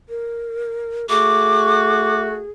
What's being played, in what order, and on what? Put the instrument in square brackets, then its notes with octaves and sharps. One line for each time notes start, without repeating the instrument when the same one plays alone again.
[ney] A#4
[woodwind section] A3 F#4 [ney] G#4 [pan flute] D6